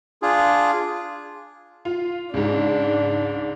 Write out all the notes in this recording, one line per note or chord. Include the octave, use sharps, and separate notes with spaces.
D4 F4 G#4
F4
C#2 G#2 D4